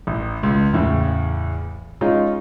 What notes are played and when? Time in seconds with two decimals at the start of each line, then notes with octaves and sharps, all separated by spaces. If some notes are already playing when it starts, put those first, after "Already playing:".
0.07 A1
0.43 C#2
0.73 E2 A2 C#3
2.01 G#3 C#4 D#4 F4